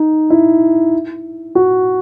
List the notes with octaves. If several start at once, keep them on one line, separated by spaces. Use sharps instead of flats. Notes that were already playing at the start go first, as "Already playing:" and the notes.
Already playing: D#4
E4
F#4